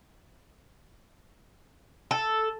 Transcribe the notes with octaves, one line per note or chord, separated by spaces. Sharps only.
A4